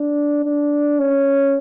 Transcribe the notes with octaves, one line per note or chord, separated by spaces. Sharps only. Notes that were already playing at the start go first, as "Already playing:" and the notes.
Already playing: D4
D4
C#4